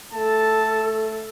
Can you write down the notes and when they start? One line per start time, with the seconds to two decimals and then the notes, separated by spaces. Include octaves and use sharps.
0.13 A3 A4 A5